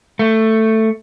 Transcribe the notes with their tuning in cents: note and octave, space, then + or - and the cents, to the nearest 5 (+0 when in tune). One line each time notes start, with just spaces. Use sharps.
A3 +10